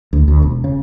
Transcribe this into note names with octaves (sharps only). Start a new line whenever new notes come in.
D2
D2
E1
C#3